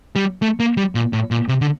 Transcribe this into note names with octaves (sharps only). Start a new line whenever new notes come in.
G3
A3
A#3
G3
A#2
A2
A#2
C3
D3